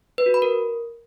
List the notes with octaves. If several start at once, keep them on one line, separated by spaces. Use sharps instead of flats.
B4
F#4
B5
A#4